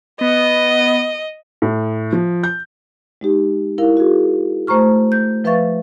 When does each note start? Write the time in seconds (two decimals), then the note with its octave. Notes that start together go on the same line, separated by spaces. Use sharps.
0.21 B3 D#5
1.62 A2
2.13 F3
2.43 G6
3.21 G#3 D#4 G4
3.78 E4 A#4 F5
3.97 F#4 G#4
4.67 A3 C5 A#5 C#6 F6
5.12 G6
5.44 F3 B4 E5 F5 C#6 A6